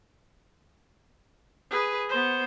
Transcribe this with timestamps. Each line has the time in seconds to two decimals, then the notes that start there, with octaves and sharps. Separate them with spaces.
1.71 G#4 B4
2.09 B3 C5